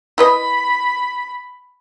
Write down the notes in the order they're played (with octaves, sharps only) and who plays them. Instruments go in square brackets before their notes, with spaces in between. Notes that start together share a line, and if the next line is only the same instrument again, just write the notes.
[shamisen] E4 B4 D#5 [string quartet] B5